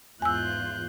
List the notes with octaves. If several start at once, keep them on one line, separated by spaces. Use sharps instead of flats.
E2 G#2 F4 G#5 E6 F#6 G6